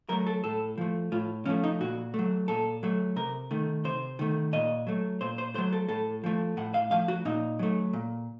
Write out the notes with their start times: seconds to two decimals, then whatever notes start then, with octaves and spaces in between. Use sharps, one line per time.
0.09 F#3 A3 A#4
0.27 A4
0.44 A2 A4
0.78 F3 A3
1.12 A2 F4
1.46 F3 A3 C#4
1.64 D#4
1.80 A#2 F#4
2.14 F#3 A3
2.48 A#2 A4
2.83 F#3 A3
3.16 C3 A#4
3.51 D#3 A3
3.84 C3 C5
4.19 D#3 A3
4.53 A#2 D#5
4.87 F#3 A3
5.21 A#2 C5
5.38 C5
5.55 A3 C5
5.58 F#3
5.73 A4
5.89 A2 A4
6.24 F3 A3
6.57 A2 F#5
6.74 F5
6.91 F3 A3 F5
7.08 F#4
7.25 A#2 D#4
7.59 F#3 A3
7.93 A#2